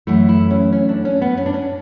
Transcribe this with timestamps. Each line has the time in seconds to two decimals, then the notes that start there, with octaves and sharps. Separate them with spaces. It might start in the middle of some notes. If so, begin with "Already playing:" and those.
0.07 F#2 E3 A3 E4
0.29 E4
0.51 C#4
0.73 C#4
0.89 D4
1.05 C#4
1.21 B3
1.37 C#4
1.46 D4
1.54 C#4